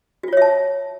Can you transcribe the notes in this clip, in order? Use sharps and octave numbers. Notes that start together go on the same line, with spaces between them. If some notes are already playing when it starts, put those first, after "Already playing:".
F4 F#4 C#5 E5 A5